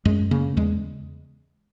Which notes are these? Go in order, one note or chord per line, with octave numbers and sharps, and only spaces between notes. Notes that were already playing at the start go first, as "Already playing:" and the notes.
F#2 G#3
C#3 A#3
E2 G#3